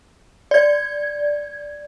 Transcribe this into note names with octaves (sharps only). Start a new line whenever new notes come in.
D5 G#6